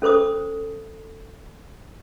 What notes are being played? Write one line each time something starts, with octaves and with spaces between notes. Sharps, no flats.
C#4 A4 C5 D6 D#6